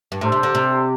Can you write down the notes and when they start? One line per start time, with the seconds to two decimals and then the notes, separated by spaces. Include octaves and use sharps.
0.12 G2
0.21 A2 D4 A4 C5
0.32 C3
0.43 D3
0.55 C3